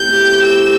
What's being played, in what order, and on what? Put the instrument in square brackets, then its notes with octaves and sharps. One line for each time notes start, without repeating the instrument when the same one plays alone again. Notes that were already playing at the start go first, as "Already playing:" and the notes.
Already playing: [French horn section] B2 A3 C4 E4 G4 [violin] G6
[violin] E6